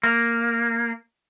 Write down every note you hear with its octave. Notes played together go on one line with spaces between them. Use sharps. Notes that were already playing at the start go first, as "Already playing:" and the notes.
A#3